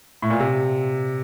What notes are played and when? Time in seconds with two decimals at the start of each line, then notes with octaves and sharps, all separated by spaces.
0.22 A2
0.30 A#2
0.40 C3